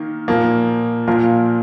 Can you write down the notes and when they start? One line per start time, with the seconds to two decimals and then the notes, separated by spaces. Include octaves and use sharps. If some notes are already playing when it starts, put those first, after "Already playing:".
Already playing: D#3 A#3
0.28 A#2 F3 A#3
1.07 A#2 F3 A#3 F4 A#4